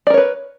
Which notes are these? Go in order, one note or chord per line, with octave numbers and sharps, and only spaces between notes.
A#4 B4 C#5 D5